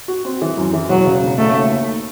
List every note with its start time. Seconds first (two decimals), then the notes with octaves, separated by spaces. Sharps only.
0.08 F#4
0.25 C4
0.42 E3
0.57 F#2
0.73 E3
0.89 E1 F#3
1.06 C#3
1.23 E1
1.38 C#3 A3
1.55 D#2
1.71 D#2